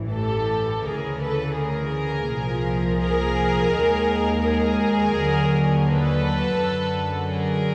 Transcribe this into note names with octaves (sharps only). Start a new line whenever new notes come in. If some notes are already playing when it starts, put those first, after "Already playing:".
Already playing: A1 G2 E3
G4 A4
D2 C#3 E3 G#4 A#4
A4 B4
G#4 A#4
C2 A#2 F3
G#4 A#4
D#2 D#3 G#3
G#4 A#4
D#2 D3 F#3
A4 B4
F#2 D3 F#3
G#4 A#4